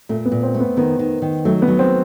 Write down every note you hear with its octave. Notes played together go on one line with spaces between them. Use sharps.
A#2 A3
B3
A#2
C4
A3
B3
D#3 B3
D#3
D#3
F#3 A3
B3
F#3
C4